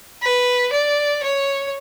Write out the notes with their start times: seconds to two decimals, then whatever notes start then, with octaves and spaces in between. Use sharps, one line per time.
0.22 B4
0.73 D5
1.23 C#5